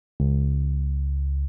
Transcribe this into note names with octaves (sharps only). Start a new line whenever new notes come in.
C#2